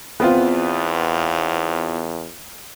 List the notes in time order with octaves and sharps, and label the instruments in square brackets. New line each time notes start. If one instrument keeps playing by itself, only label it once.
[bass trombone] E2 [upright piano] B3 C4 F4